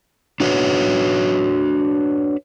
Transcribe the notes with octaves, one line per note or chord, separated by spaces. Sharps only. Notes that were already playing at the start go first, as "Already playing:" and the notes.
D4 F#4 B4 C#5